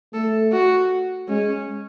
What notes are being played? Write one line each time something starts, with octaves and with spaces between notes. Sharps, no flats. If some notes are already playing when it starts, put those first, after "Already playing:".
A3 A4
F#4
G#3 C#4